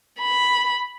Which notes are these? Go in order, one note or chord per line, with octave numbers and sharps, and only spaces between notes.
B5